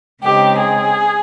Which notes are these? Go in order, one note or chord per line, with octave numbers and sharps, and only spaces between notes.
C#3 G#3 C4 D#4 G4
G#4